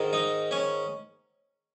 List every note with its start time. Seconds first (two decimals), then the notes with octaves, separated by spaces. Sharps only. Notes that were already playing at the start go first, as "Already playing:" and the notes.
Already playing: G#2 D#3
0.13 D#4
0.51 C#4